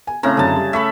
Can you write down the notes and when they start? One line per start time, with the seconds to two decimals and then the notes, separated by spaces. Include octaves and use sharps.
0.07 G#5
0.23 A2 C#3 C4 A#5
0.37 F#2 D3 C4 G#4 A5
0.56 G3
0.73 A3 E5 B5 C#6